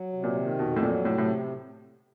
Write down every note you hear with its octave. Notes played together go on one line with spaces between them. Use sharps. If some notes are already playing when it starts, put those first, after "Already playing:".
Already playing: F#3
C3
A#2
D#3
F2 B2
A2
A#2 F#3
A2 C3
A2